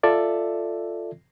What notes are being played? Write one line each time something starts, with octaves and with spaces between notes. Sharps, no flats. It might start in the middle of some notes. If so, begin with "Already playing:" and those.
F4 A4 D5 E5